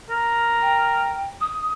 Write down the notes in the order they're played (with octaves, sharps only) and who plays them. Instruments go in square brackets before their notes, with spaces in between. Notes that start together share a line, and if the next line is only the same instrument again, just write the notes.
[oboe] A#4
[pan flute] G5
D#6